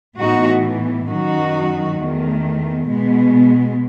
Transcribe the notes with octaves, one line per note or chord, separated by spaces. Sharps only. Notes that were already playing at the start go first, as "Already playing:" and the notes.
A2 E3 B3 D#4 F#4
F#2 D#3 F#3 D#4 F#4
E2 D#3 A3
B2 G#3 B3